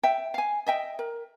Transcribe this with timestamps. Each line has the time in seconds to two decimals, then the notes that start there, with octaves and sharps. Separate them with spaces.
0.03 E5 G5
0.34 F5 G#5
0.66 D#5 E5 G5
0.99 A#4